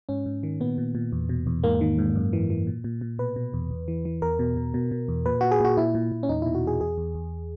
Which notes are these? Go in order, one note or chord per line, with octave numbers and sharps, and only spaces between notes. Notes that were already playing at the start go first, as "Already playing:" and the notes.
G#2 C#4
G#2
D#3
A#2 B3
A#2
A#2
E2
B2
E2
G#2 A#3
D#3
G#2
F#2
E3
E3
A#2
A#2
A#2
B2 B4
B2
E2
E2
E3
E3
E2 A#4
B2
B2
B2
B2
E2
A#2 B4
A#2 F#4
G#4
A#2 F#4
A#2 E4
A#2
A#2
C#4
E2 D#4
B2 E4
F#4
E2 G#4
E2 G#4
E2
E2